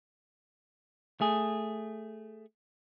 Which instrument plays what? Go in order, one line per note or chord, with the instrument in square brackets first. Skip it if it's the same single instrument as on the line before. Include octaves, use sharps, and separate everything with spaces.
[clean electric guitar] A3 G#4